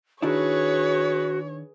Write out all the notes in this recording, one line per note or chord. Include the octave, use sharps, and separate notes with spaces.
D#3 D4 E4 F#4 G#4 B4 C#5